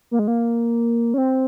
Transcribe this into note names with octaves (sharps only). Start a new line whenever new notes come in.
A#3
G#3
A#3
C#4
C4